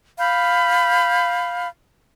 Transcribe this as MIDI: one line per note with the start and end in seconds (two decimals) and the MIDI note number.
0.18 1.67 77
0.18 1.67 83
0.18 1.67 91